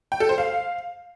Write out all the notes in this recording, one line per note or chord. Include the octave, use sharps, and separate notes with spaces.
G5
A4
C5
F5